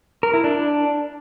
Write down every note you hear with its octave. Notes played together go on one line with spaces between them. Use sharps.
A#4
E4
D4